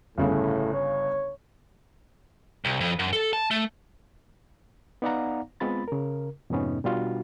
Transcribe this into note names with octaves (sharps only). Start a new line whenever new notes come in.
G1 A2 C#3
C#5
C2
F2
F#2
A4
A5
A3
B3 D#4 D5 F5 F#5 A#5
G#3 B3 C4 F4 B5 A6
C#3 A#4
F2 G#2 C3 B3 C#4 D#4
B2 G3 D4 F4 F#4